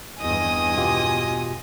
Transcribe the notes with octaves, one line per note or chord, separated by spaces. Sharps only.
E2 G2 D#5 G#5 D#6
B2 F4 G4